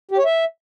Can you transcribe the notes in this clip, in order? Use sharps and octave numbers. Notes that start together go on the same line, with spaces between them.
G4
C#5
E5